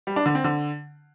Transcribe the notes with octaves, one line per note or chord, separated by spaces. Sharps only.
G3
D4
D3
C4
D3